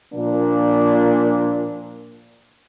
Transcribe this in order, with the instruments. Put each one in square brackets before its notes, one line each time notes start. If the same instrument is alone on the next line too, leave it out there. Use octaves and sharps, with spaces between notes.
[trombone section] A#2 F3 A#3 D4